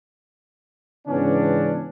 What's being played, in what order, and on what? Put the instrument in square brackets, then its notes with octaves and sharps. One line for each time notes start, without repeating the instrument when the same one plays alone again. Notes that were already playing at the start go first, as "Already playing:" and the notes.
[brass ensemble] G#2 C#3 E3 B3 C#4 D4